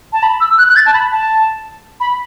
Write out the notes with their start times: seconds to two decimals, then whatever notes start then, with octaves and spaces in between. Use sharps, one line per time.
0.13 A5
0.23 B5
0.41 E6
0.58 F#6
0.69 F#6
0.76 A6
0.86 A5
0.94 B5
1.12 A5
2.00 B5